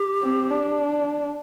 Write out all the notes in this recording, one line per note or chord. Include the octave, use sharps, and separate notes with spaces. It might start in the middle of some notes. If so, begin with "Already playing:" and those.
Already playing: G4
C4
D4